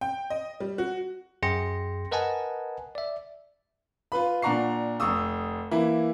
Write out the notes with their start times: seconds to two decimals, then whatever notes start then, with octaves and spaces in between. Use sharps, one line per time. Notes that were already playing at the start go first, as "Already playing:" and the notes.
0.01 G5
0.30 D#5
0.60 G3
0.78 F#4
1.43 F#2 G#4 G5 C6 A#6 C#7
2.11 A#4 B4 D#5 F#5 G#5 A5
2.95 D5 E5
4.12 F4 B4 B5
4.42 A#2 D4 F#5 A#5 C#6 C7
5.00 F1 C#6 D#6 E6
5.71 E3 A#3 E4